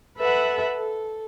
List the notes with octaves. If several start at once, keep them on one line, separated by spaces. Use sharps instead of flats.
A4 B4 E5 F#5
A4